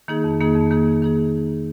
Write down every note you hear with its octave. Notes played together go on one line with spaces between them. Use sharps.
D#3 A#3 D#4 G#4
F2
D#3 A#3 D#4 G#4
F2
D#3 A#3 D#4 G#4
F2
D#3 A#3 D#4 G#4